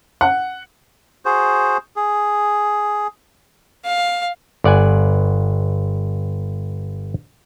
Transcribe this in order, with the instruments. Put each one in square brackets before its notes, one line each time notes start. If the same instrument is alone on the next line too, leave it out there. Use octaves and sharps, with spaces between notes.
[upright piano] F#5
[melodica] F#4 G#4 C5
G#4
[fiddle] F5
[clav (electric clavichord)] G1 D5 F#5 G#5